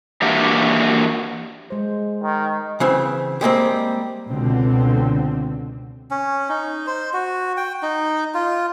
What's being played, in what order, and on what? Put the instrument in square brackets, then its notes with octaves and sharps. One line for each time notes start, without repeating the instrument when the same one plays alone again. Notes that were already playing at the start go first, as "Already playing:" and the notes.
[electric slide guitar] E3 A#3 D4 F#4 G4 E5
[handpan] G#3 C5
[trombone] D#3
[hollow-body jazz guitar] C#3 E3 C4
G3 G#3 A#3 C4
[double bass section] C#2 B2 D3 C4
[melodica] C#4
D#4
C5
F#4
G5
D#4
F4